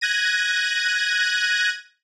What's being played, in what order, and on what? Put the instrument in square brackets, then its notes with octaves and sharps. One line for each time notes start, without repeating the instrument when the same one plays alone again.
[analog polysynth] F#6 G#6 A#6 D#7